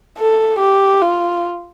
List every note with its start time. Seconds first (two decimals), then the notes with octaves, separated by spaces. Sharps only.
0.18 A4
0.59 G4
1.02 F4